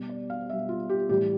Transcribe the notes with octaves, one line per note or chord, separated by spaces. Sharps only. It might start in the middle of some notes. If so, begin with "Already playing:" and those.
Already playing: B2 G3
D5
F5
B2 G3 E5
F4
G4
A2 E3 G3 G4